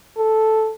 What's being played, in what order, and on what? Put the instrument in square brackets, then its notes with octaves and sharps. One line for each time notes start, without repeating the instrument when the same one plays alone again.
[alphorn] A4